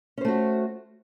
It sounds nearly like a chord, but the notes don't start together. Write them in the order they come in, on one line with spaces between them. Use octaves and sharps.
C#4 C5 A3 F#4